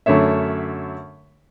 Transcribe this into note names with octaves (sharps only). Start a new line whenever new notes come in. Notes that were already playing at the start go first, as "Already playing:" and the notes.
F#2 D3 A3 C#5 E5